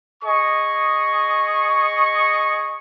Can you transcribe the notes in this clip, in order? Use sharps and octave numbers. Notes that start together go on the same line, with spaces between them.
G#4 D#5 C#6